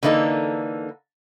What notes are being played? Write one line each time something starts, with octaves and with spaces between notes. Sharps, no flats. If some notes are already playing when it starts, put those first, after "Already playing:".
D3 E3 A#3 D#4 A4